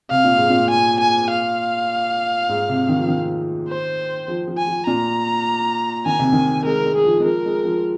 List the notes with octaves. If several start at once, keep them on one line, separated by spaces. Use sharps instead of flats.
C3 F5
A#2
G#2
A#2
G#5
G#5
F5
G#2
C3
D#3
F3
D#3
C5
F3
F3
G#5
F3
A#2 A#5
D#3 G#5
C3
D#3
G#3 A#4
G#3
G#4
F3
G#3
F3 A#4
G#3
F3